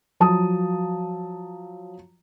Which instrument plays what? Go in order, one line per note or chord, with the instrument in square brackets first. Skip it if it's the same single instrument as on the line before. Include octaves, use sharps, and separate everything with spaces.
[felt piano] F3 F#3 A5 D#6